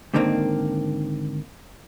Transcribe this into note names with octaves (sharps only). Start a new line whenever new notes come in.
G#2 D3 D#3 A#3 C4